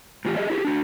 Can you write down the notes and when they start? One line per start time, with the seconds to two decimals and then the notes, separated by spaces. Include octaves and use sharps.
0.25 A2 E3 F4 G4
0.36 G4 G#4 D#5 E5
0.50 E4 G4 G#4
0.65 D4 F#4